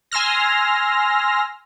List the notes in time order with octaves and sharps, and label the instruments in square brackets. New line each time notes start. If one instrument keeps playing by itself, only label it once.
[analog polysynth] G#5 C6 E6 F6 A#6